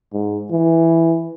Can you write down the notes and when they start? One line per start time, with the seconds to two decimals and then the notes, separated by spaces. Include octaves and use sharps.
0.13 G#2
0.51 E3